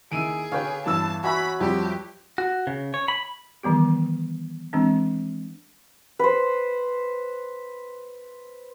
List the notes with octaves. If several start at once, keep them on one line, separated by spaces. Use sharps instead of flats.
D#2 E4 G#4 E6 D7 D#7
D3 B4 C#5 F5 G5
E2 G2 E3 A5 E6 E7
F#4 B4 E5 G#5 A#5 B5
F2 F3 G3 G4
F#4
C#3
C#5
B5
D#3 E3 G3 B3 G4
E3 G#3 C4 D4
B4 C5